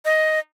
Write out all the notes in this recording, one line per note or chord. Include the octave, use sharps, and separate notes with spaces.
D#5